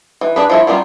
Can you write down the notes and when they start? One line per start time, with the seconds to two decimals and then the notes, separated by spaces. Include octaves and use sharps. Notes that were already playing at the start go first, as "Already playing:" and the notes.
0.21 E3
0.36 D4 G#4 B4
0.50 F3 E4 C#5
0.67 F#3 G3 C#4 D4 F4